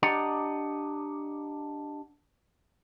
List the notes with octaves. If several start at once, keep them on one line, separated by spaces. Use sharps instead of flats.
D4 G4 D5 D#5 F#5 A#5